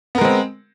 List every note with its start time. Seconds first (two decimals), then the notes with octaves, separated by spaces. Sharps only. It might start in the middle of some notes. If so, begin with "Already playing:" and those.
0.15 B3
0.18 A#4
0.21 G#3
0.25 C4